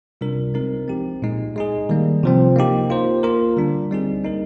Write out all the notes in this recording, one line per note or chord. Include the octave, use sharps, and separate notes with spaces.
C3 G3 D4 F4 A#4
G#3 C4 D#4 A#4
F3 C4 G4
A#2 G#3 D#4
G#3 D#4 G#4
D#3 G3 A#3
C3 F3 C4
A#3 D#4 G4
A#3 F4 C5
A#3 F4 A#4
D3 G3 D4
G3 C4 D#4 G#4
A#3 D#4 A#4